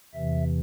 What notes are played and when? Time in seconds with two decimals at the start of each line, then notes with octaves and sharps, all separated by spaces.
0.14 E2 C3 E3 E5